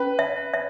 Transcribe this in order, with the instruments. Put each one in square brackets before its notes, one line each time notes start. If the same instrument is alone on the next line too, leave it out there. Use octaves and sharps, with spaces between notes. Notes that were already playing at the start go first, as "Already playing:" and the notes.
Already playing: [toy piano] C#4 [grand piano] B4
[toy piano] E5
E5